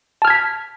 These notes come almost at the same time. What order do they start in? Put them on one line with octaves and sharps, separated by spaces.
A5 F6 G#6 B6